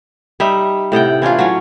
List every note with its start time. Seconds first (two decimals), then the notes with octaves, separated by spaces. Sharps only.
0.40 G3 D#4 E5
0.92 A2 C3 F#5 G5
1.22 E3 C#4 D4 F4
1.39 F#3 C#4